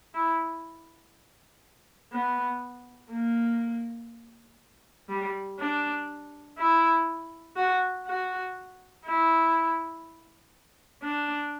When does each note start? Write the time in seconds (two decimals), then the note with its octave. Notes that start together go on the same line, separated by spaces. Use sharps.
0.14 E4
2.12 B3
3.11 A#3
5.09 G3
5.59 D4
6.58 E4
7.56 F#4
8.06 F#4
9.06 E4
11.03 D4